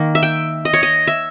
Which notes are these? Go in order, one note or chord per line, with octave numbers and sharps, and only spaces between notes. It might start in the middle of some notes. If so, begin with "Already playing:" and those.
Already playing: D#3 A#3
E5
G5
D#5
C#5
D#5
E5